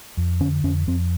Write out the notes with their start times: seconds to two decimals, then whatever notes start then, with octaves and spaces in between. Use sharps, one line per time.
0.17 F2
0.40 D3 C#4
0.64 F2 C#4
0.87 F2 C4